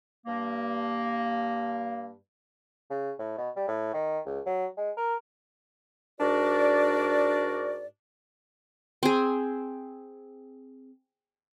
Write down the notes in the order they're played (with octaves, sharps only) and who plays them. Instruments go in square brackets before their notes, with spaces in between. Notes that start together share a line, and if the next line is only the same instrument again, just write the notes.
[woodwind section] G2 A#3
[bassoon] C#3
A2
B2
G3
A2
D#3
C#2
F#3
G#3
A#4
[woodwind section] G#2 D4 F#4 A#4 D5
[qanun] C4 G#4